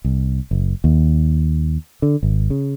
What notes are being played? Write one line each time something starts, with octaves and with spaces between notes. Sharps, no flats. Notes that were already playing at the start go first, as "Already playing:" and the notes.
C2
F#1
D#2
D3
G#1
C#3